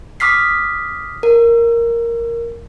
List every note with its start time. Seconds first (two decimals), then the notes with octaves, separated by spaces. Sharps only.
0.20 D6 D#6 F6 B6 C7
1.23 A#4